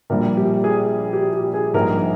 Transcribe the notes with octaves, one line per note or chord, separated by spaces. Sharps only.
A#1 A#2 G3 A#4
G4
G#4
G4
G4
G#4
A#1 G#2 G3 A#4